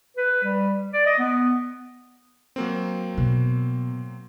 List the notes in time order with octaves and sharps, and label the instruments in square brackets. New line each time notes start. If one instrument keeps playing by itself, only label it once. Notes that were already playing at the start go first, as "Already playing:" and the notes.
[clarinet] B4
G3
D5
D#5
B3
[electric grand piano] F#3 A#3 C4
[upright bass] B2